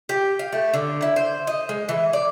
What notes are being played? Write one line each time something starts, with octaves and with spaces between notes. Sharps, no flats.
G4
F5
A3
D3
E4
C5
D#5
G#3
E3
D5